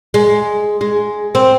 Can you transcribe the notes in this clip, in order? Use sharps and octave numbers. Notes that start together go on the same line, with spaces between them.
G#3
G#3
C4